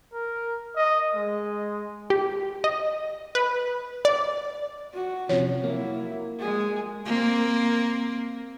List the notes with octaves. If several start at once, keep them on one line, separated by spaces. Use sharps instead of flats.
A#4
D#5
G#3
G4
D#5
B4
D5
F#4
C3 F3 C#4 C#5
F#3 A#3 E4
G#3 G#4
A#3 C4